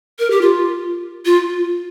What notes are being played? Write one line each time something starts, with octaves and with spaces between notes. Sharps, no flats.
A#4
G4
F4
F4